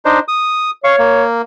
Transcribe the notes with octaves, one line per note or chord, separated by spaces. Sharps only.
D4 D#4 C5
D#6
C#5 F5 C#6
A#3